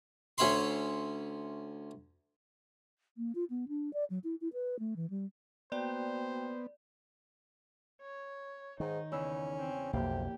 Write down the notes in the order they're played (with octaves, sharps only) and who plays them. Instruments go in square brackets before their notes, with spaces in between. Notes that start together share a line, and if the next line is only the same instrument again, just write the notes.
[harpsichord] D2 C#4 C#5 E5 B5 C6
[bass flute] A#3
F4
B3
D4
D5
F#3
E4
E4
B4
A3
E3
G3
[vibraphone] A#3 F#4 G5 [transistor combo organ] B3 [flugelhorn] C5 [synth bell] D5
[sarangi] C#5
[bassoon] G#2 [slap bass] D#3 [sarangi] D#4
[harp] E2 C#3 E6 [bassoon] C#4
[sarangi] C4
[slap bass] B1 F2 [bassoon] C3 [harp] A#3 [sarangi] G4